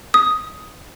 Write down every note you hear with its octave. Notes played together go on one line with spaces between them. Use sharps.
D#6